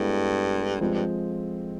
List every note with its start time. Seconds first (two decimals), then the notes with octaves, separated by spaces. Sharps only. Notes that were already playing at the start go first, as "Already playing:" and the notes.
Already playing: G2 G#3 B3 E4 A4
0.81 G2 F3 G#3 C4 F4
0.94 G2